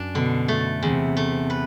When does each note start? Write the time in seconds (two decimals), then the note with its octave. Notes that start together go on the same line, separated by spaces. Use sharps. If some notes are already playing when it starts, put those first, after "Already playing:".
Already playing: F#2 D4
0.15 B2 D3
0.48 A3
0.82 E2 C3
1.17 A3
1.50 B4